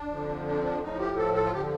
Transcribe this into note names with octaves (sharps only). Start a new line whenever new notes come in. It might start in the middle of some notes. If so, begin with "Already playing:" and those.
Already playing: D4
F2 D3 F3
D4
C4
D4
A2 F3 D#4
G4
A4
A4
F4
D3 F3 G4